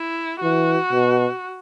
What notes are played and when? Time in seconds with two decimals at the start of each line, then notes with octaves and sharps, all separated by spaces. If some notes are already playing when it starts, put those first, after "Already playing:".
Already playing: E4
0.42 E3 F#4
0.92 B2